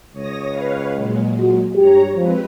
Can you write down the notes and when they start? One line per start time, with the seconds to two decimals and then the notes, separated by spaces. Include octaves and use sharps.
0.13 C#2 C#5 D#6 A#6
0.49 B4 C#5 F5
0.94 A#2 F#3 G#3
1.41 F#4
1.76 G2 G4 C#5 A#5
2.16 F3 G#3 C4 B4